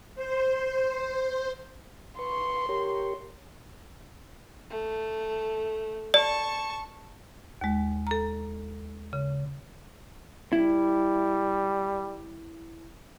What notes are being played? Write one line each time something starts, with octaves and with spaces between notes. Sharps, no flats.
C5
B4 C6 C#6
G4 A#4 C#5
A3
D5 A5 C#6
D#2 G#3
A4 A#5
C#3
G3 E4